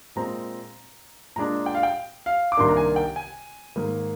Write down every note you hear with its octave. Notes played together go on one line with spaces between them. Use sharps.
A#2 G#3 C4 A#5
A#2 G#3 D4 A#5
G5
F5
G5
F5
D6
C2 C3 D#3 A#3 D4 C6
A#5
G#5
G5
G#5
G#2 D#3 A#3